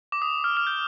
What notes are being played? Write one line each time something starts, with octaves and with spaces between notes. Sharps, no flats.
D6
D#6
F6
F6
G6